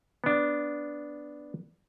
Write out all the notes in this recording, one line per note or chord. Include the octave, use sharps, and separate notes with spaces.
B3 D4